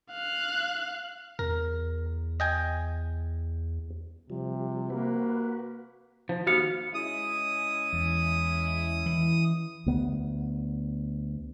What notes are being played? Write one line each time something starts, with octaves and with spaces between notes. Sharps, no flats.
F5 F#6
E2 A#4
D#5 G5 G#5
C3 F3 G3
A#3 F#4 B4
F3
D#2 B3 F#4 F5 C#7
G#3 C#4 E4 D#6
E2
E3
D2 B3